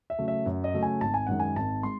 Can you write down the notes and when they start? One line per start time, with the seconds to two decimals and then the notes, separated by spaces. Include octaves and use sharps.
0.10 E5
0.19 C#3 F#3 A3
0.28 E5
0.46 F#2
0.64 D#5
0.74 C#3 F#3 A3
0.83 G#5
1.01 G#1 A5
1.14 G#5
1.27 F#2 D#3 G#3 F#5
1.40 G#5
1.56 G#1 A5
1.83 G#3 C6